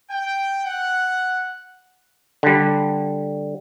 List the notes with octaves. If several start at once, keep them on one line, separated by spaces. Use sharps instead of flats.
G5
F#5
D3 G3